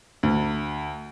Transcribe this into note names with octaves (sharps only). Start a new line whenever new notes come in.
D2